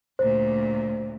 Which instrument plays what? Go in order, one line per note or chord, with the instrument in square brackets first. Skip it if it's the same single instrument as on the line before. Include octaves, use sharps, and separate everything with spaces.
[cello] D2 A#2 [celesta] C5